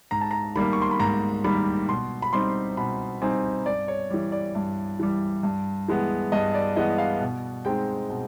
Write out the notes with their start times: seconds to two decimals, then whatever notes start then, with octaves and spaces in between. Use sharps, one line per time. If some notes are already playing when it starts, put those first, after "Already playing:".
0.11 G#2 A#5
0.21 A5
0.31 A#5
0.55 D#3 G3 A#3 B5
0.73 C#6
0.82 C6
0.91 B5
1.00 G#2 A#5
1.44 D#3 G3 A#3 B5
1.88 B2 C6
2.22 B5
2.33 G3 C4 D#4 C6
2.77 B2 B5
3.22 G3 C4 D#4 G#5
3.66 G2 D5
3.88 C#5
4.11 E3 G3
4.32 D5
4.55 G2
4.99 E3 G3
5.43 G2
5.88 E3 G#3 B3
6.32 G2 D#5
6.54 D5
6.76 E3 G#3 B3 D#5
6.98 F5
7.20 B2
7.65 G#3 C4 D#4 G5
8.09 B2